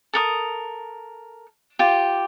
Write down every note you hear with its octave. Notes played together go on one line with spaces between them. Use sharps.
A4 A#4 D#6
F4 G4